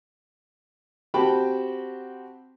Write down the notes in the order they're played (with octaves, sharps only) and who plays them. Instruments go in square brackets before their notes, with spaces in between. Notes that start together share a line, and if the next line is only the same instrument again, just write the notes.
[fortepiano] C4 F#4 G4 G5 A5 B5